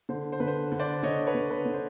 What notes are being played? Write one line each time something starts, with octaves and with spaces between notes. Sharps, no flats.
D3 C5
C5
D3 B4
C5
D3
C5 D5
D3 C#5 D#5
B4 C#5
D3
B4
D3
C5